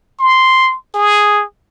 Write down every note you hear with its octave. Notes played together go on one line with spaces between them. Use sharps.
C6
G#4